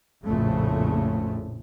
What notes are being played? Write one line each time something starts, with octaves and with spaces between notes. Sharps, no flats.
A#1 F2 A2 C#3 A3